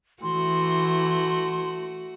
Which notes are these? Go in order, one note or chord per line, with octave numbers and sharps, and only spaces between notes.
E3 A3 F#4 C6